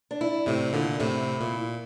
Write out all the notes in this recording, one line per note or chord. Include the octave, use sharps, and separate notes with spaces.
D4
E4
A2 C3
A#2 D3
A2 C3 E4
A#2